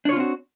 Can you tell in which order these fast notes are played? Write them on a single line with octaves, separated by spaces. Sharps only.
D4 C#5 F4 C4 F#4